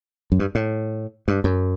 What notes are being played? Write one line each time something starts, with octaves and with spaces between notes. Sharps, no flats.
F#2
G2
A2
G2
F#2